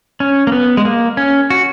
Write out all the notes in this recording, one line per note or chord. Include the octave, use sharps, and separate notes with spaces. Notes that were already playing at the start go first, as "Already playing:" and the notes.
C#4
A#3
B3
G#3
A#3
C#4
F#4